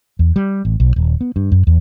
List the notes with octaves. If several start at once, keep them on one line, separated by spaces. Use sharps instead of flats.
E2
G3
A1
B1
D#1
B3
G2
F#2
E2